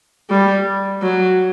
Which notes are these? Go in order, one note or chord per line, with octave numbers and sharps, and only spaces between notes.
G3
F#3